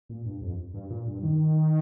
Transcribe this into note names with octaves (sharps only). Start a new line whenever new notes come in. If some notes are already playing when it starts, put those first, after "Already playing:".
A#2
G2
F2
G2
A#2
G2
D#3